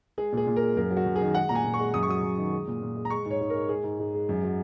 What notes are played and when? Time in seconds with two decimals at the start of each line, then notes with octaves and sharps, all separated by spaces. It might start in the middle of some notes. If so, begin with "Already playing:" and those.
0.18 G#3 G#4
0.32 A#2 G#4
0.47 A#2
0.56 A#4
0.62 G#3
0.76 F#2 A#4
0.91 F#3
0.97 F#4
1.06 F#2
1.16 G#4
1.21 D#3
1.35 G#3 F#5
1.49 A#2 A#5
1.55 G#5
1.64 A#2
1.74 C#6
1.80 G#3
1.94 F#2 D#6
2.03 C#6
2.09 F#3 D#6
2.23 F#2
2.37 D#3
2.53 G#3
2.67 A#2
2.82 A#2
2.96 G#3
3.05 A#5
3.10 G#3 C#6
3.25 G#2
3.31 C#5
3.41 G#2
3.50 A#4
3.55 G#3
3.69 G#3 G#4
3.84 G#2
3.99 G#2
4.14 G#3
4.29 F#2
4.43 F#3